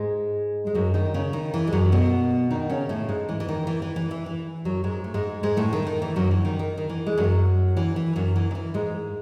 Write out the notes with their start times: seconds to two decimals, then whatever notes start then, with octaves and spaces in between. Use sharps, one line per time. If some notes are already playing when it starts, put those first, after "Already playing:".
Already playing: G#2 G#3
0.67 G#3
0.75 F#2 F#3
0.94 D#3 D#4
1.14 C#3 C#4
1.33 D#3
1.54 E3
1.67 G#3
1.72 F#2 F#3
1.92 B2 B3
2.51 D#3 D#4
2.69 C#3 C#4
2.89 A2 A3
3.09 G#2 G#3
3.29 E3
3.40 E3
3.49 D#3
3.67 E3
3.82 E3
3.96 E3
4.11 E3
4.26 E3
4.65 F#2 F#3
4.84 G#2 G#3
5.04 A3
5.14 G#2 G#3
5.43 G#2 G#3
5.57 A2 A3
5.73 D#3
5.87 D#3
6.02 E3
6.16 F#2 F#3
6.31 E3
6.45 D#3
6.59 D#3
6.77 D#3
6.90 E3
7.07 G#3
7.18 F#2 F#3
7.77 E3
7.96 E3
8.16 F#2 F#3
8.36 E3
8.51 D#3
8.55 E3
8.74 G#2 G#3